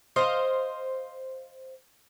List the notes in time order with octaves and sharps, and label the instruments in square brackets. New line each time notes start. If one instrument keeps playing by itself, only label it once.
[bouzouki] C5 D#5 F5